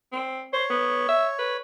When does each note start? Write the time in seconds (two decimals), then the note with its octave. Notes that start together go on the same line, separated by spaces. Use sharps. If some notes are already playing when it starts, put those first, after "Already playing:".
0.12 C4
0.53 C5 C#5
0.70 B3
1.09 E5
1.39 B4